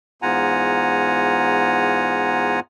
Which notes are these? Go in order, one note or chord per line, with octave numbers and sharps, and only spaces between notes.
E2 G#2 F4 F#5 G#5 A#5